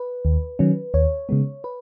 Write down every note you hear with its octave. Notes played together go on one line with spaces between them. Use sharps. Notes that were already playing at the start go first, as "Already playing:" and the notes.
Already playing: B4
D#2
D#3 F#3 C#4
D#2 C#5
C#3 G#3 B3
B4